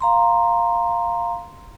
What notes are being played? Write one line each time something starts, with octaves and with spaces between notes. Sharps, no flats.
F5 A#5 C6